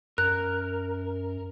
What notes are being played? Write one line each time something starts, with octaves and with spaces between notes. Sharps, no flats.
F#2 A#4 F#6